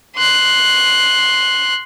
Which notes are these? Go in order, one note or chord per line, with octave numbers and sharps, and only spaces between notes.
C6 F#6